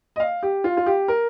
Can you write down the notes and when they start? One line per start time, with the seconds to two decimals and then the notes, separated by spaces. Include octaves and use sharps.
0.16 D#5
0.20 F5
0.43 G4
0.64 F4
0.77 F4
0.86 G4
1.08 A#4